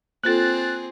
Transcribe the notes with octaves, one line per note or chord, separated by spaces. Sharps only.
A#3 C4 F4 G#4 A4 F#6 A6